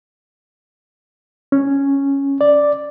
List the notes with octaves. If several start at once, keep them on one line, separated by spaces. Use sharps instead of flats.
C#4
D5